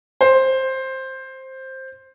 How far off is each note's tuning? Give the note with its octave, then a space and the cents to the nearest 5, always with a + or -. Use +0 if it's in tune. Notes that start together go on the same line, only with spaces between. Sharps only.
C5 +10